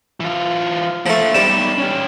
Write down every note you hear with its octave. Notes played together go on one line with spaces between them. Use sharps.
E3 F4
F3 A3 A#3 C5
G3 B3 D#4 E7
C#4 G4